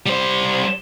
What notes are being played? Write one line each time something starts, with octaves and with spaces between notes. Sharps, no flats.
G3 C5